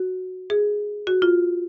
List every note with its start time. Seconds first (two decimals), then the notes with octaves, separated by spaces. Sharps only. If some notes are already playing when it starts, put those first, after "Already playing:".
Already playing: F#4
0.50 G#4
1.07 F#4
1.22 F4